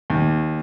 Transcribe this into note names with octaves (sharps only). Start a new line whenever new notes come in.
D#2